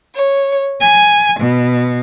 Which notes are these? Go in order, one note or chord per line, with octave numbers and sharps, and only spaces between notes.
C#5
G#5
B2